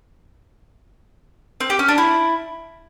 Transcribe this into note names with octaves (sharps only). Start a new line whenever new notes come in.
C4
G4
C#4
D4
E4